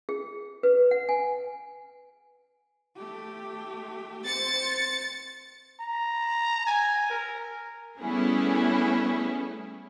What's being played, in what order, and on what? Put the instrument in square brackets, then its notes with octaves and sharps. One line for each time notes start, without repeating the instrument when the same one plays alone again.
[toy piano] G#4
B4
F#5
G#5
[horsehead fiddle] A3 G4
[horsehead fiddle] C4 C5 [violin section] A6 C#7
[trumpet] A#5
G#5
A#4
[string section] G3 A3 B3 C#4 E4 G#4